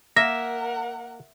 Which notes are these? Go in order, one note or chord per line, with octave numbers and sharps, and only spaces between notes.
A#3 A#4 E5 F#5 A#6